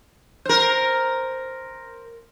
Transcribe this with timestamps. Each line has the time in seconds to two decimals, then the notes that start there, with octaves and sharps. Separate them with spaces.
0.45 A#4 C5